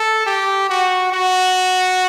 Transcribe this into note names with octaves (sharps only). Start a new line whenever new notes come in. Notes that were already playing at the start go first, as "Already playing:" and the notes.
Already playing: A4
G4
F#4
F#4